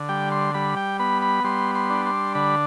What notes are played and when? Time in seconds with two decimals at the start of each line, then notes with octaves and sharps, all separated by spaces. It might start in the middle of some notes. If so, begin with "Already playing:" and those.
Already playing: D3
0.09 G3 G5
0.32 C6
0.54 G3 B5
0.77 G5
0.99 B3 B5
1.22 B5
1.44 G3 C6
1.75 C6
1.90 D4
2.06 C6
2.35 D3 B5